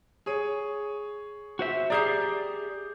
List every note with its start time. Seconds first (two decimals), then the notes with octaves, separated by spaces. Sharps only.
0.26 G#4 C#5 D#7
1.59 F#4 C5 E5
1.90 G4 G#4 D5 A#5 G6 C7